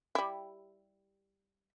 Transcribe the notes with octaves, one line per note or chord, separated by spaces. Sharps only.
G3 E4